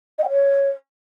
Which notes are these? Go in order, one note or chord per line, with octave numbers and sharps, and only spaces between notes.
D#5
G5
C#5